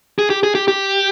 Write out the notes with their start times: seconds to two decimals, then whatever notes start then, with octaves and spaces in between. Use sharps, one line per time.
0.19 G#4
0.30 G4
0.43 G#4
0.55 G4
0.68 G4